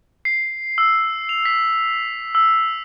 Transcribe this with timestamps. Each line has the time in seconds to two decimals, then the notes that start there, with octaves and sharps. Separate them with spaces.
0.25 C7
0.78 E6
1.29 F7
1.45 B6
2.35 E6